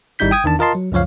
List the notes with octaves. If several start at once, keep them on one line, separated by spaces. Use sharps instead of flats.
G#1 G3 D#4 E4 G6 B6
G5 D#6 G#6
E2 D#3 D4 A5
F4 A#4 D#5 A5 C6
F#3
C#2 F#2 F3 C#5 F5